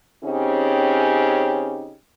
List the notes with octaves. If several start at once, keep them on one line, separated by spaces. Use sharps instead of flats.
C#3 C4 C#4 D#4 G4